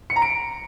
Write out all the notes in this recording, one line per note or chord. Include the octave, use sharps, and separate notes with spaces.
C#7
A#5
D7